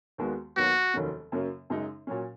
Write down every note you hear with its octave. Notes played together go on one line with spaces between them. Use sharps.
D#2 D#3 G#3 B3 F#4
D#2 D#3 F#3 B3 F#4
F1 D#2 D#3 F#3 C#4
F#2 C#3 F#3 A#3
F#2 C#3 G#3 D#4
A#2 F#3 C#4